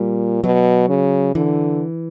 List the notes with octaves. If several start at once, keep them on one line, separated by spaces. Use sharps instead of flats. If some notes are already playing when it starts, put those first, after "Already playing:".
Already playing: A#2 G3
B2 F#3
C#3
D3 E3